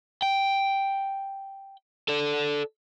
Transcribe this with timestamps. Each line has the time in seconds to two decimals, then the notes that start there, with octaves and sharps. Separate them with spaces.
0.22 G5
2.08 A4 D5